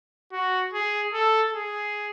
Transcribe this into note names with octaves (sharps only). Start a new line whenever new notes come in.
F#4
G#4
A4
G#4